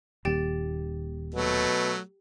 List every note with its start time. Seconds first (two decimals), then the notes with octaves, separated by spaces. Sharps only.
0.25 D#1 D#2 G4 G5 A6
1.34 B2 F#3 A3